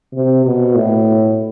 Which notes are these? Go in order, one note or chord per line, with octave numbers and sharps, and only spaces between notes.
C3
B2
A2